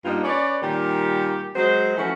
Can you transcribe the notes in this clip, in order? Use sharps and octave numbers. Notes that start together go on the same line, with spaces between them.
G2 A#3 B3 D4 D#4 F4
C#4 B4 C#5 D5
A#2 D#3 G3 G4
F#3 G#3 C5
E3 F3 A3 C#4 F#4 A4